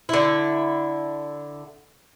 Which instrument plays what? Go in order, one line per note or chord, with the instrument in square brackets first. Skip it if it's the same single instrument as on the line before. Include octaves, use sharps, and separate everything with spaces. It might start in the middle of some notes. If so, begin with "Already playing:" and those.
[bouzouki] D3 E4